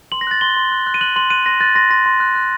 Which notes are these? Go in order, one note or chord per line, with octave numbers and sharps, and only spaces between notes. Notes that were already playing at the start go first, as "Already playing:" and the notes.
C6 F#7
A#6
F#6 A6
C6 G7
C6
F#6
F#6
D#7
F#6 F#7
C6 F#7
F#6 D#7
C6 A#6
F#6 A6
C6 A#6
C6 A#6
C6
F#6
F#6